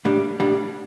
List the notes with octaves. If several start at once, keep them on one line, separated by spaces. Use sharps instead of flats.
A2 G3 D4
A2 G3 D4